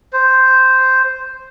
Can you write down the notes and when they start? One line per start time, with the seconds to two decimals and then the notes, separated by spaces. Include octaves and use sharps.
0.13 C5